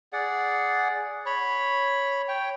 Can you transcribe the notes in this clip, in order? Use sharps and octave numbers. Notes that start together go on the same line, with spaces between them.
G#4 D5 F#5
C#5 B5
C#5 G5